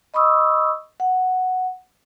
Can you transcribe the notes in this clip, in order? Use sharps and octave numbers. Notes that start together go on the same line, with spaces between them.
D#5 B5 C#6 D#6 E6
F#5